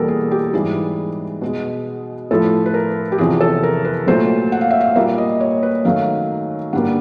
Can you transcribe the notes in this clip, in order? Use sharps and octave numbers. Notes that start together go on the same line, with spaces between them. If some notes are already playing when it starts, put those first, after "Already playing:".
Already playing: E2 B2 G3 A#3 A4 A#4
G#4
G4
G#2 E3 G3 G#4
B2 G#3
A2 F3 A3 A4
B4
A#4
G4
E2 C3 F3 G#4
A4
A#4
B4
A#2 F#3 A3 C5
F#5
F5
E5
F5
A#2 G3 A#3 E5
D#5
C#5
B4
F#2 D#3 F#3 A3 F5
G2 D3 G3 A#3 F#5